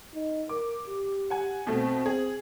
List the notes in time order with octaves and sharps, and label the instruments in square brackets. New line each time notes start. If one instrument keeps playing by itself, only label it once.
[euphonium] D#4
[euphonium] A#4 [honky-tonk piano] D6
[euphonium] G4
[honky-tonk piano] F#5 G#5
[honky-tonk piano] B2 A3 [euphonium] C4
[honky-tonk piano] G#4